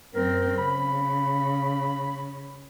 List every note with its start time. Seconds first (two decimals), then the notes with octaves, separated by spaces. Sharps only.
0.15 F#2 C4 A#4
0.58 C#3 B5